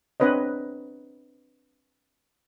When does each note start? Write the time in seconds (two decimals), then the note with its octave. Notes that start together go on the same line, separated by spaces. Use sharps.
0.20 C4 D4 B4 C#5 D#5